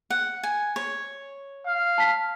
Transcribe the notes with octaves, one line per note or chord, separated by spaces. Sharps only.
F#5
G#5
C#5
F5
A5 B6